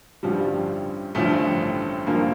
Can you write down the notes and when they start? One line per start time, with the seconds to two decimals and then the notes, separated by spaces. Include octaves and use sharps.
0.23 A1 G2 D3 F3 G3
1.15 A1 G2 D3 F3 A3
2.07 A1 G2 D3 F3 A#3